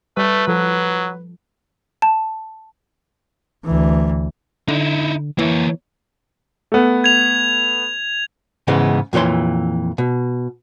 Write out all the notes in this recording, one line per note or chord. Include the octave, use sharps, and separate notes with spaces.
G3 A3 B4
F3 F#3 A4
A5
D2 E3
D3 D#4 E4
E3 A#3 C#5
A3 B3
G#6 F7
G#2 C#3 E3 G#3 B3
F2 A#2 E3 C#5 C6
B2